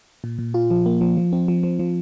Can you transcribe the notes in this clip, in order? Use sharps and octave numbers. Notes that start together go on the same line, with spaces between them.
A#2
A#2
F4
F3
A#3
F3
F3
C4
F3
F3
F3